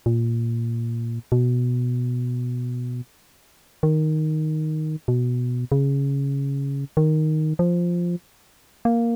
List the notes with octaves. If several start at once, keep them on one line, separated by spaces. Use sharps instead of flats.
A#2
B2
D#3
B2
C#3
D#3
F3
A#3